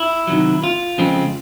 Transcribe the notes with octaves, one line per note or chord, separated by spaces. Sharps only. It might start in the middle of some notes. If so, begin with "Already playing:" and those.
Already playing: E4
C3 D#3 F#3
F4
F2 C#3 F3 G#3 C4